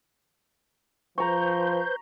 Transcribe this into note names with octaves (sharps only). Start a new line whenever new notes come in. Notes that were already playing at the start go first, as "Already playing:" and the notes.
F3 B4 C5 A#5 C#6 G6